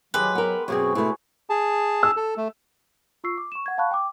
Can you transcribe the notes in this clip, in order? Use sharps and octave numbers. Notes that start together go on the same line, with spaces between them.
D#3 F#3 G#3 G4 B4
B3 A#4
F#2 B2 C4 G#4 C#5 F#5 C#6
B2 A3 E4 F#4 G#4
G#4 A5
E6
A4
A3
F4 C#6 E6 C7
D6
C#6 E7
F#5 G#6
F5 A5 B5 C#6 F#6
G5 D6